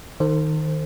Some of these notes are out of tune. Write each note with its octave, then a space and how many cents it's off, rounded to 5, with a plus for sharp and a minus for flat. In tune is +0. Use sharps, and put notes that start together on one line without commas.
D#3 +0 A4 +40 C5 +0